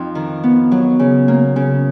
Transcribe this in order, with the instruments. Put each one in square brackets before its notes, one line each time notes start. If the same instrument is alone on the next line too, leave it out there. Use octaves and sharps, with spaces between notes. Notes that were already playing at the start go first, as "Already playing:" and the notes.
Already playing: [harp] F2 D#4
D#3
B3
F#3
C#3
A#3
C#3